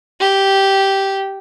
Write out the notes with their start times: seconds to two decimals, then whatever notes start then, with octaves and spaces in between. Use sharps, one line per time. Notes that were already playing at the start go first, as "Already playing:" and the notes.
0.21 G4